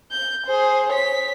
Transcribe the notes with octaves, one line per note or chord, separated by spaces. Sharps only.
G6
G#4 C5
C#5 B6